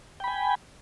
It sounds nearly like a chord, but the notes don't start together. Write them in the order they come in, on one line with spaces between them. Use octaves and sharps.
G5 B5 G#5